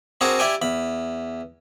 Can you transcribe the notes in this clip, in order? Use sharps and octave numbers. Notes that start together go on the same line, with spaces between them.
C4 D4 F#4 G#4 A#4
E4 G4 D5 G5 G#5
E2 B5